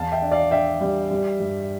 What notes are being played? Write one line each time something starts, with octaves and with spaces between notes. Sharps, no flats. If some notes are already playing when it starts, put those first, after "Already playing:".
Already playing: E2 F5 A5
E5 G5
D4
D5 F5
D4 E5 G5
G3
G3
G2